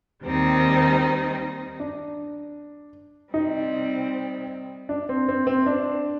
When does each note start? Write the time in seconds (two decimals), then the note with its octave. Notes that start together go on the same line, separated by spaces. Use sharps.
0.24 D#2 D#3 G3 C4 D#4
1.80 D4
3.34 C3 G3 C4 D#4
4.89 D4
5.09 C4
5.28 C4
5.47 C4
5.66 D4